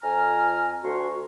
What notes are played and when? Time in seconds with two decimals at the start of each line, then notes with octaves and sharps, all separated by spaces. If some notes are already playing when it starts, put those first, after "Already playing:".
0.03 F2 G#5 A#5 F6
0.83 D2 F#4 C6 C#6